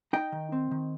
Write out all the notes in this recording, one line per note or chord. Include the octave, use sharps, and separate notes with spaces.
D#4 D#5 G5
D#3
C4
D#3